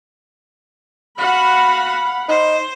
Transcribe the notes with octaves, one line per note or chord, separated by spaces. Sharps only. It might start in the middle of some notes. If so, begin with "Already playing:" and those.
F#4 F5 F#5 B5
D#4 C5